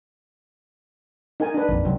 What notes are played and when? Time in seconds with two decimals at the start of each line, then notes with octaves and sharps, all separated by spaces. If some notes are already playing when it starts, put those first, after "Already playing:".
1.40 D#4 A#4 G#5
1.54 D4 B4
1.68 A#1 F2
1.85 C#2 C3 F#3